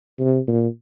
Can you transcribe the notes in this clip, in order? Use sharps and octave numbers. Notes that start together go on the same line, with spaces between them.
C3
A#2